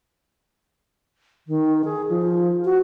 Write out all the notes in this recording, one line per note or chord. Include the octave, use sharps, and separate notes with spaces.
D#3
G#4
F3
F#4